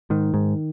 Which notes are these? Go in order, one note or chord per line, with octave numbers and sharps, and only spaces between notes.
G#2 D#3
G#2